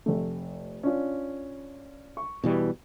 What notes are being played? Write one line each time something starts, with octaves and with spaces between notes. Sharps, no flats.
F1 A3
C#4 D4 F4
C#6
B2 E3 G3